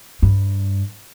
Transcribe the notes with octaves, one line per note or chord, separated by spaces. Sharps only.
G2